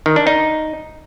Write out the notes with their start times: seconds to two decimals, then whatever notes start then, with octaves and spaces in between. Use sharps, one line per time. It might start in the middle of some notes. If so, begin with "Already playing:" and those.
0.06 D#3
0.16 D4
0.27 D#4